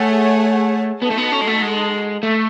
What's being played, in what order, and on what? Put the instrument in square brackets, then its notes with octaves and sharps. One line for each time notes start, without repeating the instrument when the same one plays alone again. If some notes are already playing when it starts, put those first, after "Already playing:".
Already playing: [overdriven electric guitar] A3 [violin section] G#4 C#5 F#5 A5
[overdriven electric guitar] B3 [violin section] D#4 F#4 A4 D#5 A5
[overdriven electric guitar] A3
B3
C#4
G#3
A3
G#3
A3